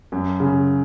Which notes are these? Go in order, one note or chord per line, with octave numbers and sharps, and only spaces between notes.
F#2
C#3